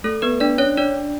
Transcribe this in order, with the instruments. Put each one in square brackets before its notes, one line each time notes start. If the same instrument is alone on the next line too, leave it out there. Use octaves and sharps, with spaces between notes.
[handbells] A3 A4
B3 B4
D4 D5
C#4 C#5
D4 D5